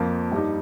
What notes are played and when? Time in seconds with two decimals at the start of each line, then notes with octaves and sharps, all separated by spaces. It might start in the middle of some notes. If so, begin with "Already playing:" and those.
Already playing: F2 F3 A#3 F4
0.32 G2 G3 D#4